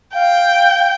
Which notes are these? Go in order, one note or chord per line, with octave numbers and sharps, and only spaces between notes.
F5 G5